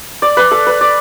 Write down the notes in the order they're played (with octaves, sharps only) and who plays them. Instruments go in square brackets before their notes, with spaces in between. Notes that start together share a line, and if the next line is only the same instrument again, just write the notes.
[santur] D5
B4
A4
B4
D5